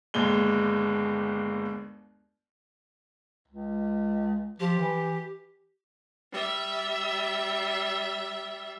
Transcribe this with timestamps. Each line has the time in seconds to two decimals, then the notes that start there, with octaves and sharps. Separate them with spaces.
0.14 G1 D#2 G#3 G7
3.48 C#2
4.60 F3 G4
4.79 E3
6.33 G3 E5